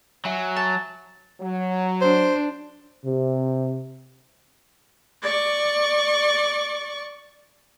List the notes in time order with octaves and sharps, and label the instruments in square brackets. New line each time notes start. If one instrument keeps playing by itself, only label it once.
[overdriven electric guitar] F#3 [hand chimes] E5 G#5
[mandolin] A5
[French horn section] F#3
[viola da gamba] D4 [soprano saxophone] C5
[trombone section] C3
[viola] D5 C#6